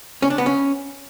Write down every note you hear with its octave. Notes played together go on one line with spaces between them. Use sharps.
C#4
D4
B3
C#4